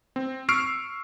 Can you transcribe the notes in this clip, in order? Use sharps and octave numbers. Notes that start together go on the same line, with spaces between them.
C4
C#6 E6 F6 C7 D7